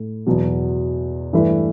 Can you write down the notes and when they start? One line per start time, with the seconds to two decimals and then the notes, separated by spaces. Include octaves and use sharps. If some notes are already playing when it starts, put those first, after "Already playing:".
Already playing: A2
0.27 E2 B2 F#3
1.33 G2 E3 A3 E4 B4